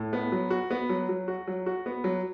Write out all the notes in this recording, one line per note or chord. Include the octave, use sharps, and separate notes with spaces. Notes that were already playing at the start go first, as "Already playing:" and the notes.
Already playing: A2
B3
F#3
F#4
B3
F#3
F#3
F#4
F#3
F#4
B3
F#3